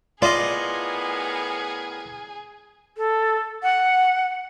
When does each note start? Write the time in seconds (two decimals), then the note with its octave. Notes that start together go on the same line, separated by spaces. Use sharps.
0.22 A2 B3 F4 G#4 A#4 D5 D#5
2.98 A4
3.63 F#5